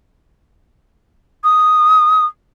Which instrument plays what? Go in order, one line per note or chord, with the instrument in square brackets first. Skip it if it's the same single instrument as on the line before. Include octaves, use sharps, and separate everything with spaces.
[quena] D#6